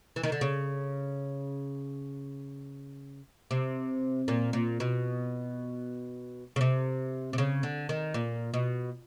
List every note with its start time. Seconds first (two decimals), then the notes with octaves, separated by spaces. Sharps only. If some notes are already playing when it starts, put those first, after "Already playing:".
0.16 E3
0.23 D#3
0.32 D3
0.41 C#3
3.51 C3
4.28 A#2
4.53 A#2
4.80 B2
6.56 C#3
6.61 C3
7.33 C3
7.38 C#3
7.63 D3
7.89 D#3
8.14 A#2
8.54 B2